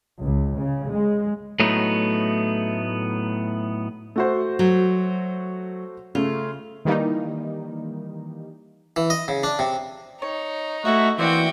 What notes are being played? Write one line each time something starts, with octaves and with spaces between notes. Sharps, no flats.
C#2
C#3
G#3
A2 F#3 A3 B3 D#4
A3 F#4 C5
F#3
C#3 A3 F4
D#3 E3 G3 A#3 D#4
E3
D#5
C#3
D4
C3
D#4 C#5
A3 E4 F#4 A4 E5
E3 A#3 C4 E4 F#4 D5 G5